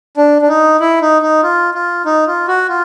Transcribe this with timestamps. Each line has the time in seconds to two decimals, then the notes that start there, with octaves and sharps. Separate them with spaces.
0.17 D4
0.42 D4
0.48 D#4
0.80 E4
1.01 D#4
1.22 D#4
1.43 F4
1.74 F4
2.06 D#4
2.27 F4
2.48 F#4
2.69 F4